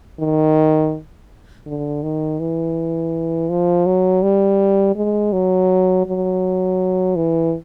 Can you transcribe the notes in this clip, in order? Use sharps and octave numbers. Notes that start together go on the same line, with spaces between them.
D#3
D3
D#3
E3
F3
F#3
G3
G#3
F#3
F#3
E3